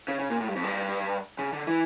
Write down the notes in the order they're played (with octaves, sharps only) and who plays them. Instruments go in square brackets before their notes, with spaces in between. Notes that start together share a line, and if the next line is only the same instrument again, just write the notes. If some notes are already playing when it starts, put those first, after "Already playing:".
[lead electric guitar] C#3
C#3
A#2
A2
G2
F2
G2
C#3
D3
E3